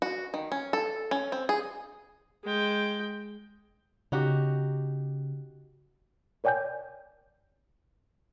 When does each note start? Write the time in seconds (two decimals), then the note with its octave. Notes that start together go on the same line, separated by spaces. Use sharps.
0.02 F#4
0.34 D#3
0.52 C#4
0.73 A4
1.11 C#4
1.32 C4
1.49 G#4
2.44 G#3 G5
4.12 C#3 D#4 F#4 G4
6.44 A#4 C#5 D5 G5 G#5 G6